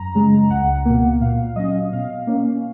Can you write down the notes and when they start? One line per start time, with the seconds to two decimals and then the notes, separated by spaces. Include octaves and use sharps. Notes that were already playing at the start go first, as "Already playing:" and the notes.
Already playing: F#2 A#5
0.15 C#3 G#3
0.50 C#2 F#5
0.85 B2 A#3
1.20 A#2 F5
1.56 F#3 C#4 D#5
1.93 B2 F5
2.27 A#3 C#4